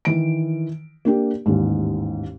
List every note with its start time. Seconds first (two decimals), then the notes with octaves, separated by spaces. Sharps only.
0.05 D#3 E3 D7
1.05 A#3 D4 G4
1.46 A1 D#2 G#2